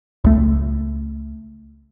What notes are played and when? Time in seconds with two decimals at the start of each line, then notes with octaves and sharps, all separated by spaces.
0.24 C#2 A3